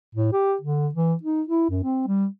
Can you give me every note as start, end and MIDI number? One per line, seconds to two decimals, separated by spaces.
0.15 0.32 45
0.32 0.55 67
0.61 0.88 50
0.95 1.14 52
1.23 1.42 63
1.49 1.69 64
1.70 1.81 42
1.84 2.06 60
2.07 2.26 55